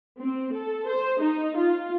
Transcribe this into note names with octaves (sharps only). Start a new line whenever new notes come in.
C4
A4
C5
D#4
F4